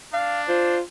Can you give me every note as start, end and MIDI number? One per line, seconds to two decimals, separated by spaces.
0.13 0.77 62
0.13 0.41 77
0.48 0.81 65
0.48 0.79 72